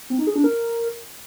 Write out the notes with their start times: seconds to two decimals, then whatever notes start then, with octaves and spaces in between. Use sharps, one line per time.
0.10 C4
0.18 D#4
0.27 G#4
0.35 D4
0.44 A#4